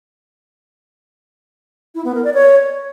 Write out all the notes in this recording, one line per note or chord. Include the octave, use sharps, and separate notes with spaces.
E4
B3
A#4
D5
C#5